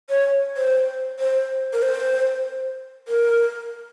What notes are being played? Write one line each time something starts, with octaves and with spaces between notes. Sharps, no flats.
C#5
C5
C5
A#4
C5
A#4